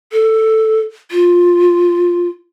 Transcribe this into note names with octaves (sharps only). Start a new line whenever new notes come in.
A4
F4